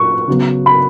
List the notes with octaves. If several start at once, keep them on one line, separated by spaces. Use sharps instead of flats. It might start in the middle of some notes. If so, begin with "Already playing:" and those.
Already playing: A#2 F#3 C#6
C#3 F#3 B3
B5